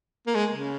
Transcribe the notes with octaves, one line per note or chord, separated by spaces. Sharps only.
A#3
G#3
C#3